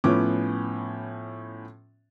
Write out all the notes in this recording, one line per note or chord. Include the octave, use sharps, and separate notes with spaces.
A2 F3 B3 C#4 D6